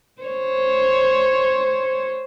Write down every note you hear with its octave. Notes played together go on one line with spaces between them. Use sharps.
C5 C#5